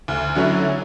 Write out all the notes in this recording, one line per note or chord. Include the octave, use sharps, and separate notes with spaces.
D2
D3 F#3 C#4 E4